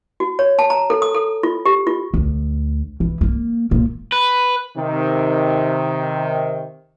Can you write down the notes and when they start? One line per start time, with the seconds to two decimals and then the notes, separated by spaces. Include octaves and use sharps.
0.20 F#4
0.39 C#5
0.59 A5
0.70 A#5
0.90 A4
1.02 D#6
1.14 A4
1.43 F4
1.66 G4
1.87 F4
2.14 D2
3.00 E3
3.21 A#3
3.71 A#2 A#3
4.12 B4
4.77 C3 D#3